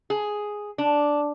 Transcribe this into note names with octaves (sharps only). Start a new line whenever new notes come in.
G#4
D4